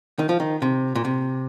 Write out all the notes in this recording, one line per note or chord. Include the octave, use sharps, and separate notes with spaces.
D#3
F3
D#3
C3
A#2
C3